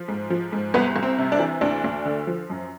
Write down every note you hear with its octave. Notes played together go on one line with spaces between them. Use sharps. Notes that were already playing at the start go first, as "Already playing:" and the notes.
Already playing: F3
G#2
F3
G#2
C2 B3
C2
C4
C3
D4
E3
D2 D4
D2
D3
F3
F#2